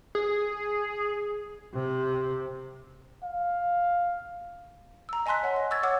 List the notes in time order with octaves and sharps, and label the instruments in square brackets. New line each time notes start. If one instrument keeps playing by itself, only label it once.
[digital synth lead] G#4
[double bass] C3
[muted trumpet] F5
[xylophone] A#5 E6
D#5 G#5 A5 C6 F#6 B6
C#5 F#5 G#5
D#5
C#6 E6 G#6 A6
C#5 F#5 D6 E6 F6 G#6